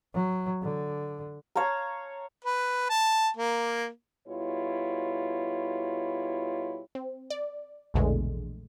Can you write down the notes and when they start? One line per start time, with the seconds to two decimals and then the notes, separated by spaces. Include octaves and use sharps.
0.14 F#3
0.62 D3
1.55 C#5 F5 A5 A#5
2.44 B4
2.89 A5
3.37 A#3
4.28 B2 G3 E4 F4 C#5
6.95 C4
7.30 D5
7.94 A#1 E2 B2 D3 G#3 A3